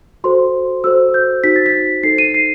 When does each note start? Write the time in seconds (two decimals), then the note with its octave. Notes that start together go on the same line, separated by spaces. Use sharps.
0.24 F#4 A4 C5 C6
0.84 F#4 A4 C5 E6
1.14 G6
1.43 D#4 F#4 C5 B6
1.56 A6
1.66 B6
2.03 D#4 A4 C5 C7
2.18 D#7
2.34 C7